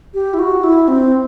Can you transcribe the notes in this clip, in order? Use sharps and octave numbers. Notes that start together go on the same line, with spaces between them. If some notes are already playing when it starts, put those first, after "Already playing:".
G4
E4
F#4
E4
C4